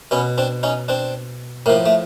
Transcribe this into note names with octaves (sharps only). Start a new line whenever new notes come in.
B2 B3 C#4
C4 D4
C#4 D#4
C4 D4
A2 F3 A#3
A3